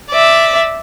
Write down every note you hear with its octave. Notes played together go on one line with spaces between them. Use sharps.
D5 E5